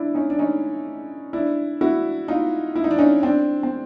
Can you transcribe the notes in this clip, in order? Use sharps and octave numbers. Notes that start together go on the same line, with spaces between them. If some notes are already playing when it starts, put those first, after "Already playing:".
Already playing: D4 E4
C#4 D#4
D4
C#4 D#4
D4 E4
E4 F#4
D#4 F4
E4
D#4
D4
C#4 D#4
C4 D4
C4